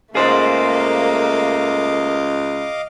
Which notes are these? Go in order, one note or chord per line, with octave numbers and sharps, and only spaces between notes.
C#2 A3 A#3 G#4 C5 D#5 F5 D6